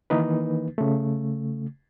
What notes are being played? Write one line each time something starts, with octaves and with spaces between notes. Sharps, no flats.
D#3 E3 A#3 D#4 B4
C#3 A3